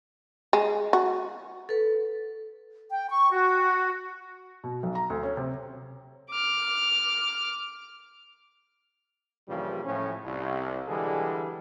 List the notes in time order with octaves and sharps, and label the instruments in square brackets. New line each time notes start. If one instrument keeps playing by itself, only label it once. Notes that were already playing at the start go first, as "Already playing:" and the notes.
[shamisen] G#3
F#4
[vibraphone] A4 B4
[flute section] G5
C#6
F#4
[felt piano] B2
B1
A#5
D2
C#4
C3
[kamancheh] D6 F6
[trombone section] G2 A#2 C#3 E3 F3 G3
A2 F3 C#4
C2
D3 E3 G3 G#3 G#4 A4